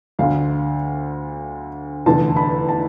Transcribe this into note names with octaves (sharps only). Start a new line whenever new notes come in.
D2 D3 F5
F1 E2 D3 A5
B5
A5